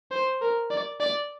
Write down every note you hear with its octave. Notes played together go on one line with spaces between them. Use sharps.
C5
A#4
D5
D5